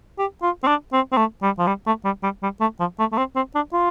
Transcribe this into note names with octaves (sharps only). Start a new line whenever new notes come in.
G4
F4
C4
D4
C4
C4
A3
G3
F3
G3
A3
G3
G3
G3
A3
F3
A3
A3
C4
C4
D4
F4